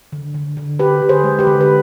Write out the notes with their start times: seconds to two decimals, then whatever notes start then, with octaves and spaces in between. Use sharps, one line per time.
0.12 D3
0.34 D3
0.57 D3
0.79 D3 G4 B4
1.02 D3
1.09 G#4 C5
1.24 G#3
1.39 G4 B4
1.47 D3
1.61 B4